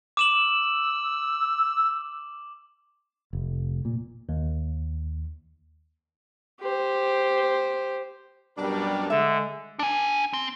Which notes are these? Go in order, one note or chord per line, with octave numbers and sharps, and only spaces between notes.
D6 E6 E7 F#7
F1
A#2
D#2
G4 C5
F#2 B2 G3 D4 A#4
D3 G#3 E5
D4 G#5
C4